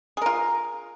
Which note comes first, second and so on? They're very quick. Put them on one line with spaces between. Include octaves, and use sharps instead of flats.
G#4 A#4 F4